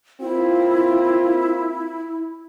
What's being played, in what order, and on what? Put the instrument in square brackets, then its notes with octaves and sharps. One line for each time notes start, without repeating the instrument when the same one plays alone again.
[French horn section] A#3 C4 F4 [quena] E4